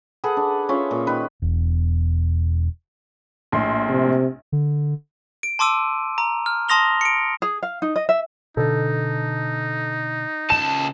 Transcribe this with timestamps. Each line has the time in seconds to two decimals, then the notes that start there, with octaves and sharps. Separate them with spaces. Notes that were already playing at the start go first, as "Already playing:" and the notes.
0.24 G#4 A4 B4 F#5
0.37 D4
0.69 C#4 F4 C#5 E5
0.91 A#2
1.07 D#3 B4
1.42 E1
3.52 A#1 A2 C6
3.89 C3
4.52 D3
5.43 D7
5.59 A5 C6 D6 E6 D#7
6.18 A#5
6.46 F6
6.68 A5 C6 D#6 A#6 F7 G7
7.01 C#7 D7
7.42 G#4
7.63 F5
7.82 D#4
7.96 D#5
8.09 E5
8.57 B2 D3 D#4 A4
10.50 C#2 A5 E7